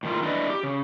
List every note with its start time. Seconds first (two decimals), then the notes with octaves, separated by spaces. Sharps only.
0.03 A2 D#3 F4
0.22 D4 E4 B4 D5 D#5
0.50 G4
0.63 C#3